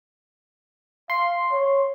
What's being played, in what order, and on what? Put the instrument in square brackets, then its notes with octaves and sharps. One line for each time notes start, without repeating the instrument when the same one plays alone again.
[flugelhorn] F5 [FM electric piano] C6
[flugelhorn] C#5